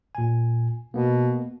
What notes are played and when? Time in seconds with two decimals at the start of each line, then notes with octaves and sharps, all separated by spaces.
0.15 A#2 G#5
0.94 B2 A#3 B3